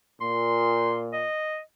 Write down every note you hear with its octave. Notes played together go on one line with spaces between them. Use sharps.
A#2 C6
D#5